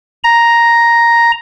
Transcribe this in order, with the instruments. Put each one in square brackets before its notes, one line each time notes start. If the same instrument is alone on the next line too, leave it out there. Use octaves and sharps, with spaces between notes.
[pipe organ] A#5